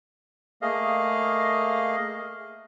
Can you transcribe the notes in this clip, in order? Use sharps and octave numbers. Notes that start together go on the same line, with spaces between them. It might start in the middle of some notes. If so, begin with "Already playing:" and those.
A3 A#3 G#4 D#5 F5